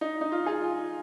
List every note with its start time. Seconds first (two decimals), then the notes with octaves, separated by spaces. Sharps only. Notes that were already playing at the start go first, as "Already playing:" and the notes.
0.01 D#4
0.21 D#4
0.32 F4
0.46 F4 G#4